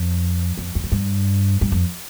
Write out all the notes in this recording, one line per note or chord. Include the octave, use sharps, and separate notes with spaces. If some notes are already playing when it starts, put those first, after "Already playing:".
Already playing: F2
F2
F2
G#2
G2
G2
F2